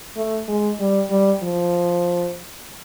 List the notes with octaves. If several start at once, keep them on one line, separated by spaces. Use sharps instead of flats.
A3
G#3
G3
G3
F3